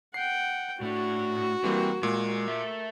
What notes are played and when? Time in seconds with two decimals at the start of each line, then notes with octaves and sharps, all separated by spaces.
0.14 F#5 G5 C7
0.82 A2 A3 D4 F#4
1.64 E3 G3 A#3 C4
2.03 A#2 G#3 A#4
2.48 A3 E5